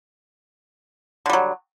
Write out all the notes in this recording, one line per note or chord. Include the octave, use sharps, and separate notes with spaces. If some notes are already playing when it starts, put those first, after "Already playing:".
D3 F#3 G3